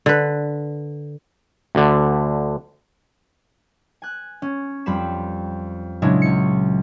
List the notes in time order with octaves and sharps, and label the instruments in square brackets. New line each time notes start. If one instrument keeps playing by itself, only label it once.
[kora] D3 B4
[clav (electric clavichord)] D2 D3
[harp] G#5 F#6
C#4
F2 G3 C4 B5 E7
A#2 C#3 F#3 G#3 D4 E4
C#2 C#7